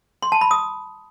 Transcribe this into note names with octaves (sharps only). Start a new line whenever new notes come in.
C6
A5
B5
D#6